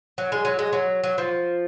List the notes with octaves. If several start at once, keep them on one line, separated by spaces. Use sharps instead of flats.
F#3
G#3
F#3
G#3
F#3
F#3
F3